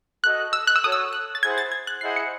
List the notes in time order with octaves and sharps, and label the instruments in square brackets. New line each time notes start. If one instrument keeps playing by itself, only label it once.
[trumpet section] F#4 A4 D#5 [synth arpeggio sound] F#6
[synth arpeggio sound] E6
F#6
E6
[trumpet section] F#4 A4 C#5 F#5 [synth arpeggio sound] D#6
[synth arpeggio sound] E6
F#6
A6
[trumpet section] E4 G#4 C5 F#5 [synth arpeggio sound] G#6
[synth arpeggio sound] A6
G#6
F#6
[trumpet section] E4 G#4 C5 D#5 F#5 [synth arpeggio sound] C7
[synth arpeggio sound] C#7